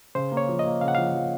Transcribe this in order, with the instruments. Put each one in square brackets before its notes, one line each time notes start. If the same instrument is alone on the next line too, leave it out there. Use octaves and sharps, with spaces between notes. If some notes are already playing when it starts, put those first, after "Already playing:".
[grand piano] C#3 [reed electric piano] C5
[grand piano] A#3
[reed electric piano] C#5
[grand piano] F3
[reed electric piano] D#5
[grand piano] A#3
[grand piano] C#3 [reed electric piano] F5
[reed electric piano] F#5
[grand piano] F3 [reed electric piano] F5
[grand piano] F3